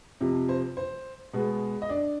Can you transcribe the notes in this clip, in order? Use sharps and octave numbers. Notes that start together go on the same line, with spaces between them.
F2 C3 F3
C5
C5
B2 G#3 B3
D#5
D4 D5